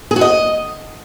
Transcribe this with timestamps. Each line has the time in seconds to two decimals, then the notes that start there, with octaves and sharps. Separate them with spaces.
0.11 G#4
0.16 F#4
0.21 D#5